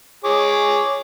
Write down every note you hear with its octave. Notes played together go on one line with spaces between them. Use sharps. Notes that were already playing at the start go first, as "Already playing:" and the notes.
G#4 C#5 D6